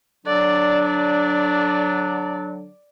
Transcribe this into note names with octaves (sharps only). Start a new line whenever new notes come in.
D3 F#3 D4 D5
D5